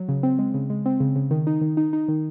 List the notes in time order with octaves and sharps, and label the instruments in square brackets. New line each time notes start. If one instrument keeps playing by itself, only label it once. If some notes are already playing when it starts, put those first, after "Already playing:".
Already playing: [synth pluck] F#3
C#3
C4
G#3
C#3
G#3
C4
C#3
C#3
D#3
D#4
D#3
D#4
D#4
D#3